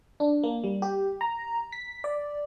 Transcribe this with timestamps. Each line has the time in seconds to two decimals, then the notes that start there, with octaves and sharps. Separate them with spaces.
0.20 D4
0.43 A#3
0.64 G3
0.82 G4
1.21 A#5
1.72 B6
2.04 D5